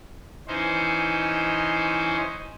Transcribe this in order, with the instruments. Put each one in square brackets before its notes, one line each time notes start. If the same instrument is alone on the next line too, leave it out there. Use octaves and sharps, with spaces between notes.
[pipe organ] E3 C#4 D#4 C5